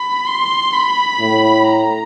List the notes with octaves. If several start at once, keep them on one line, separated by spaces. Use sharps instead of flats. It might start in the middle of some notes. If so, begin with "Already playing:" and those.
Already playing: B5
C6
B5
A2
A#5